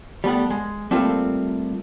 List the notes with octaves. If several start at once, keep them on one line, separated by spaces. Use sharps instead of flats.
G3 A3 B3 F#5
G#3
G3 A3 A#3 C4 F4